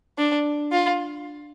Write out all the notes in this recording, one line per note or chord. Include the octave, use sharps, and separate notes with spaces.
D4
F4